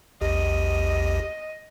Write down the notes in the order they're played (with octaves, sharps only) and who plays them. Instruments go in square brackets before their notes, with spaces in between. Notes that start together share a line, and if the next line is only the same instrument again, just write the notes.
[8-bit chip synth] A#1 E2 G4 [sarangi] D#5